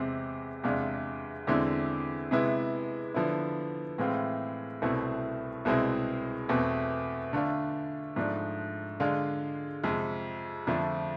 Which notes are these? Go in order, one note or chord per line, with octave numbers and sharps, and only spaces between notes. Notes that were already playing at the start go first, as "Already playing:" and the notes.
Already playing: E2 C3 G#3 C4
E2 C3 G#3 D4 F4
E2 D3 G#3 C4 E4
C3 G#3 B3 E4
D3 F3 B3 E4
A2 E3 G#3 C4 F4
C2 B2 A3 C4 E4
C2 B2 G#3 C4 E4
E2 B2 A3 C4
D3 A3 D4 F4
G#2 F3 A3 D4
D3 G#3 D4 F4
F2 C3 G#3
F2 D3 F3 A3 D4